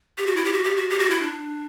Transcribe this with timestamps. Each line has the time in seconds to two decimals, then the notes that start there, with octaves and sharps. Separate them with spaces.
0.18 G4
0.27 F#4
0.36 E4
0.45 G4
0.53 F#4
0.64 G4
0.76 F#4
0.90 G4
0.99 F#4
1.10 E4
1.22 D4